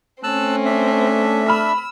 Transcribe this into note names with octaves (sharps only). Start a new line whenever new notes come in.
A3 C4 C#4 A5 E6 F#6
D4 E5
B5 E6 F6